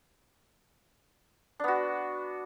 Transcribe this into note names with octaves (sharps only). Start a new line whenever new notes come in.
B3 D4 F#4